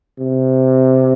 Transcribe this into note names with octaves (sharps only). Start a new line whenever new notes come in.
C3